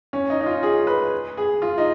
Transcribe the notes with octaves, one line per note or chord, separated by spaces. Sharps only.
C#4
D#4
D#4
F4
G#4
B4
G#4
F4
D#4